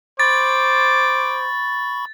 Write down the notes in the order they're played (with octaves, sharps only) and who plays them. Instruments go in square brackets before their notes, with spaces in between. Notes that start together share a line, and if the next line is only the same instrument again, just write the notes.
[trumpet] C5 [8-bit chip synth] B5 C#6 [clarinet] D6 [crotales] A6